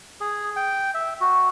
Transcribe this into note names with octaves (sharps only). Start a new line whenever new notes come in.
G#4
G5
E5
F#4